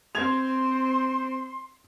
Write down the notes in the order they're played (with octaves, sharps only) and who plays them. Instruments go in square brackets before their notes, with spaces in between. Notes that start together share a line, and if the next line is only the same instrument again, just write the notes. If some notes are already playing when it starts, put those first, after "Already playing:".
[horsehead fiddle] C4 C5 [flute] C6 [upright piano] G#6 F7